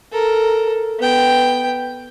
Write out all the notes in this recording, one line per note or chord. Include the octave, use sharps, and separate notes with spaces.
A4 A#4
B3 G5